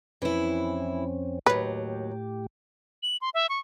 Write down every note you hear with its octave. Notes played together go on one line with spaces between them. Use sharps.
F2 E3 C4 C#4 E4
D#2 A2 F#3 G4 B4
F#7
C6
E5
C#6